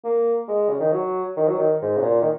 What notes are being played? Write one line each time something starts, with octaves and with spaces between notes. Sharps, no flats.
A#3
G#3
C#3
D#3
F#3
D#3
F#3
D#3
G#2
C#3
A#2
D#3